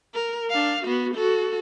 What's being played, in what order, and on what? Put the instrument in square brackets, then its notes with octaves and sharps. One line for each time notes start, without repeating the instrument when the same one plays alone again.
[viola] A#4
D4 F5
B3 F#4
F#4 A4